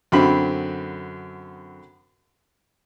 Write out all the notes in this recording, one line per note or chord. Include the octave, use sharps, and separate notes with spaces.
F#2 D3 C4 B5